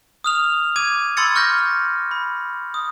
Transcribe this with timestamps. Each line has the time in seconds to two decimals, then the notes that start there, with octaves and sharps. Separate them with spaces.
0.24 D#6 F6 F7
0.76 D6 G#6 D#7
1.17 B5 C6 E6 G#6 A6 C#7
1.35 C#6 F6 G6 A#6
2.11 B5
2.74 D#6